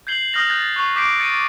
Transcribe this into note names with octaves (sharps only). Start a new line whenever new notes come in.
G6 G#6 C7 F#7 G7
D#6 F6 G6 A#6 F7
F#6 G6 A6
C#6 F#6 C7 F7
D6 G6 B6 C7 D7
A6 C#7 D#7